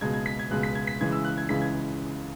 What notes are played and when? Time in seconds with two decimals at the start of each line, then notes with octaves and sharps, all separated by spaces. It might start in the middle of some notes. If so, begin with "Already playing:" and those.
0.01 C#2 B2 G#3 G#6
0.13 G#6
0.26 B6
0.39 G#6
0.51 C#2 B2 G#3 F#6
0.63 B6
0.75 G#6
0.87 B6
1.01 C#2 C#3 E3 G#3 G#6
1.12 E6
1.25 F#6
1.38 G#6
1.49 C#2 C#3 E3 G#3 B6
1.61 G#6